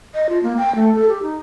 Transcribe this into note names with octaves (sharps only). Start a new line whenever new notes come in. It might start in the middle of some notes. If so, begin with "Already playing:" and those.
D#5
F4
A#3
G5
A3
A4
G4
D#4